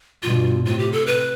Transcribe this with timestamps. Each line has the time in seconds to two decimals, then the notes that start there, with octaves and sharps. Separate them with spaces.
0.23 G2 B2 F4
0.64 A2 C3 F4
0.79 G4
0.92 A4
1.07 B4